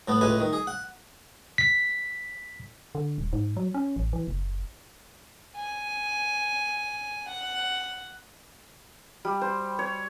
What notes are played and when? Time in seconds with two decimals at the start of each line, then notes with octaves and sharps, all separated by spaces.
0.08 A2 A3 B3
0.21 C#2 A2 G#3 B4 G#5
0.40 D#3
0.53 G#4
0.67 F#5
1.58 B6
2.95 D3
3.18 D#1
3.33 G#2
3.57 F#3
3.74 C#4
3.96 A1
4.13 E3
4.28 F#1
5.56 G#5
7.28 F#5
9.25 G3
9.41 C5
9.79 C#5